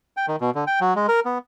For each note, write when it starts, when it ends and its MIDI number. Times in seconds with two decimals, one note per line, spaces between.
0.17 0.26 79
0.28 0.36 51
0.41 0.50 47
0.55 0.64 50
0.67 0.80 79
0.81 0.94 54
0.96 1.07 56
1.08 1.20 70
1.25 1.38 59